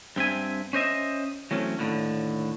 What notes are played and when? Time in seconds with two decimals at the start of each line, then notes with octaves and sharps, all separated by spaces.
0.16 G2 C4 E5 G#5
0.73 C#4 C5 D#5 E5
1.51 E3 F#3 A3 C4 C#4
1.79 D#2 A2 D3